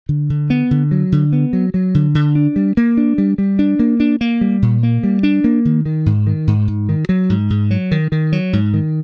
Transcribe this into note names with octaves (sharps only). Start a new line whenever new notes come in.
D3
D3
B3
D3
F#3
D3
B3
F#3
F#3
D3
D3
D4
G3
A#3
D4
G3
G3
D4
A#3
D4
A#3
G3
A#2
A#3
G3
D4
A#3
D#3
D#3
G#2
D#3
G#2
G#2
D#3
F#3
G#2
G#2
F#3
D#3
D#3
F#3
G#2
D#3